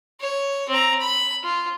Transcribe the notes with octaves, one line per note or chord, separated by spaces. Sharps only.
C#5
C4 A#5
B5
F4